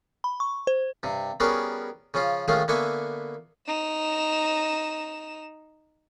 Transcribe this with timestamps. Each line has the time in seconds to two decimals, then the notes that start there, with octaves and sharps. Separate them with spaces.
0.24 B5
0.40 C#6
0.67 C5
1.03 G2 C3
1.40 G3 B3 C#4 F#4 G#4 A#4
2.14 C#3 F3 C#4 F4
2.48 D#3 F3 G#3 A3 C#4 F4
2.68 D3 A#3 B3 E5 G#5 C#6
3.68 D#4 E7